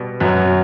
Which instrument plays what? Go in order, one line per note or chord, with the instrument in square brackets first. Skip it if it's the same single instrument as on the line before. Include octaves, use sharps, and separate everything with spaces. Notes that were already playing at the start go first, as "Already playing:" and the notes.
Already playing: [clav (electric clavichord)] B2 G3
[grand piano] F#2 F#3 [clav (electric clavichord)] B3